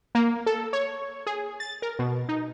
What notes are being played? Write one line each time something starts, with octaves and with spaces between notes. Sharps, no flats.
A#3
A4
C#5
G#4
A6
A#4
B2
D#4